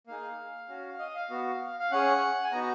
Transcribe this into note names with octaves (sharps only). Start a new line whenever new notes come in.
A#3 D#4 G#4 F5
C#4 F#4
D#5
F5
B3 F#4
F5
C#4 G#4 F#5
G#5
B3 D#4 F#4 A#5